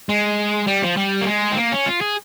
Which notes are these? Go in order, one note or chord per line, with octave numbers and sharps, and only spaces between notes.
G#3
G3
F3
G3
A#3
G#3
C4
A#3
C#4
F4
G#4